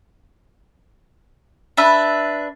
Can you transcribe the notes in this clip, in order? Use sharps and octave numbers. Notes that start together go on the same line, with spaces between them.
D4 B4 E5